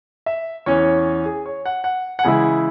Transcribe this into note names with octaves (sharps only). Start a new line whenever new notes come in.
E5
E2 E3 C#4 C#5
G#4
C#5
F#5
F#5
F#5
C#3 E3 G#3 E4 G#5